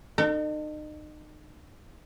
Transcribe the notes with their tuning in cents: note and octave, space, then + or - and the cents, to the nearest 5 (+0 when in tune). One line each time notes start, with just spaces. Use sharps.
D#4 -35 A4 +40